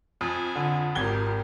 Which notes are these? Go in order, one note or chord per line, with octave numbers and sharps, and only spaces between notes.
F2 G#5
D3
G#1 G4 A#4 G#6 G7